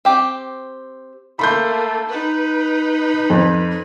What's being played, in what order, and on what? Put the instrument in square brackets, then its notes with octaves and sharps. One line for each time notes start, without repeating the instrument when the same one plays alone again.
[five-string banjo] C4 G4
[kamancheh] A3 A#3 [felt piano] B5 C6 G6
[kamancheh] D#4 B4
[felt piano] F2